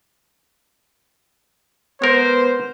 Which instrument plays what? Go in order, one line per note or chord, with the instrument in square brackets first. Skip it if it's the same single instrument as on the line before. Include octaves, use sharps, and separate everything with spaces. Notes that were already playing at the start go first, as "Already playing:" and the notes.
[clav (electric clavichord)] G#3 A#4 [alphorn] B3 [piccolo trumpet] C5